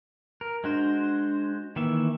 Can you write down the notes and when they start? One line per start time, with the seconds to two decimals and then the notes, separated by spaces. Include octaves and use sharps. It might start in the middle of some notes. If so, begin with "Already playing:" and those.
0.41 A#4
0.64 G#3 D4 F#4 C5
1.76 D#3 E3 A#3 E5